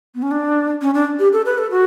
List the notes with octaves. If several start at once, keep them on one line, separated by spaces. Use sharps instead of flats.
B3
C#4
D4
C#4
D4
G4
A4
B4
A4
F#4